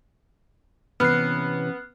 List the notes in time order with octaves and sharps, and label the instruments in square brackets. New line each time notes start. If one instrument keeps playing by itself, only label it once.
[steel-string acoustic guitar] C3 E3 C#4 [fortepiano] B3 [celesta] F6 F#6 C7